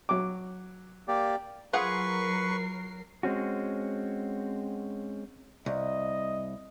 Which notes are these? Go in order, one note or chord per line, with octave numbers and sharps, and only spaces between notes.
F#3 D6
A#3 G4 D5
F#3 F4 G#4 A#4 B4 F#5 C#6 C7
G#3 C4 C#4 F#4
C2 D#5